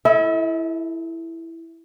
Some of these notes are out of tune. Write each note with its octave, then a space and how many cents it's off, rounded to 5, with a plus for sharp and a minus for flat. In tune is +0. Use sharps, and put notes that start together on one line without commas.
E4 +5 A4 +0 E5 -45